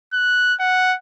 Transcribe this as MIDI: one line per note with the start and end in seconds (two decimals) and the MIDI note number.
0.13 0.55 90
0.60 0.96 78